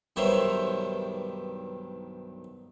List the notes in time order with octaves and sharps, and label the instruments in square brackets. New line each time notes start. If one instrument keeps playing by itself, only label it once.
[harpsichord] B1 G2 D#3 C5 C#5 E5